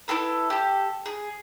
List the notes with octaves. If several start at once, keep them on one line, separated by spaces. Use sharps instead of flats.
E4 F4 A4 B4
G4 A4
G#4